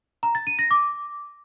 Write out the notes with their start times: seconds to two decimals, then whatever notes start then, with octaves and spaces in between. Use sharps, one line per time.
0.23 A#5
0.35 A6
0.47 D#7
0.59 A#6
0.71 D6